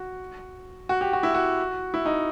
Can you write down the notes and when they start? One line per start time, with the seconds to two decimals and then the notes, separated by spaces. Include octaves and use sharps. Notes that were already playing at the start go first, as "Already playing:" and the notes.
Already playing: F#4
0.89 F#4
1.01 G4
1.13 F#4
1.23 E4
1.34 F#4
1.94 E4
2.05 D#4